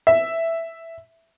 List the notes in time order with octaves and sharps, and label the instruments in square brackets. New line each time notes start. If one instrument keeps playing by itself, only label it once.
[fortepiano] E5